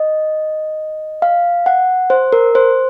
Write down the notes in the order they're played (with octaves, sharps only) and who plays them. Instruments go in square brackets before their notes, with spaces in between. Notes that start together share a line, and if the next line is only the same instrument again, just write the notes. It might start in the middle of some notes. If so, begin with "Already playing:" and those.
Already playing: [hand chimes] D#5
F5
F#5
C5
A#4
C5